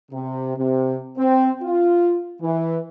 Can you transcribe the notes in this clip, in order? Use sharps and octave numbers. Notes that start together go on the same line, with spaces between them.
C3
C3
C4
F4
E3